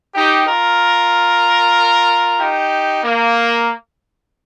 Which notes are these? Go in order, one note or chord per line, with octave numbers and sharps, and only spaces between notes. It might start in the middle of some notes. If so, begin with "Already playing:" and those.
D#4 G4
F4 A#4
D#4 G4
A#3